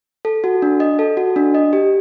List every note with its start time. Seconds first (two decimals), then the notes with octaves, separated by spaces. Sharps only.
0.25 A4
0.44 F#4
0.62 D4
0.80 D#5
0.99 A4
1.17 F#4
1.36 D4
1.55 D#5
1.73 G4